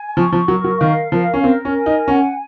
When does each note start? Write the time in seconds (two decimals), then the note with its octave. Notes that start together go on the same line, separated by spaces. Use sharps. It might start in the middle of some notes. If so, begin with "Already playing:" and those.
Already playing: G#5
0.16 F3 C#6
0.32 F3
0.48 F#3 A#4
0.64 F#3
0.80 D#3 F5
1.12 F3 A#4
1.34 C#4
1.43 C4 A#4
1.65 C#4
1.76 G#5
1.86 D#4
2.07 C#4 F#5